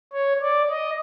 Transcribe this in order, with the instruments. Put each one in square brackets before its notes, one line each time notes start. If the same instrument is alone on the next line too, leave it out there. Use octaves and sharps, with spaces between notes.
[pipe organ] C#5
D5
D#5